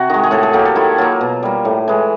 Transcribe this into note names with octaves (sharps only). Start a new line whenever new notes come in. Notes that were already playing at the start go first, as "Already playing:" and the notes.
Already playing: C3 F#4
D#3 G#3
G#4
A2 A4
G#4
F#3 A#3 G4
A4
D#3 E4
F#3 A#3 F4
B2
G3 A#3
A2
E3 G#3